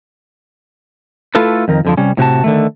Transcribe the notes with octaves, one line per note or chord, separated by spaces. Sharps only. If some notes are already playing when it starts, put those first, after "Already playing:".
A3 E4 F4 A4 B4
F2 D#3 A#4
F2 D3 F3
C3 G3 C#4
A2 C3 F#4 A5
D3 D#3 A3